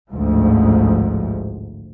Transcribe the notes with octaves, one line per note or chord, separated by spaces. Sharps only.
A1 D2 G#2 F3